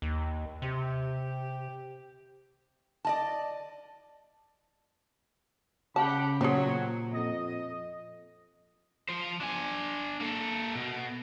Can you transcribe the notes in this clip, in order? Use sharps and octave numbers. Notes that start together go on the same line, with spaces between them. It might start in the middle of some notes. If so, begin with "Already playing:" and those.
D#2
C3 G4
D5 D#5 A5
C#3 G4 F#5 A5 B5
A#2 F#3 C4 G#4
F2 D#5
F3 C5
D4 G#5
A#3 A4
B2